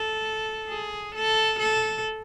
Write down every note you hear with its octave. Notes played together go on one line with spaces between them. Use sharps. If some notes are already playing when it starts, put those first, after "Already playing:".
Already playing: A4
G#4
A4
A4